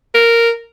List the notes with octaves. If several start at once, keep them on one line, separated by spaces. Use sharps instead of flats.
A#4